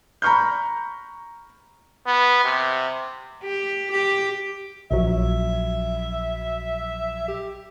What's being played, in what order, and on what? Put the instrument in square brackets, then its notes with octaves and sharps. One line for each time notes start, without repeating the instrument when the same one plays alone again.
[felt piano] A#5 B5 C#6 F6 G6
[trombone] B3
C3
[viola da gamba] G4
G4
[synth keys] A#1 F#3 [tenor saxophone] E5
[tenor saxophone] G4